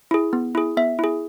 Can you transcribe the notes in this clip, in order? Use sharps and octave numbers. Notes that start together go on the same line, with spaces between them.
E4 G#4
B3
E4 G#4
B3 E5
E4 G#4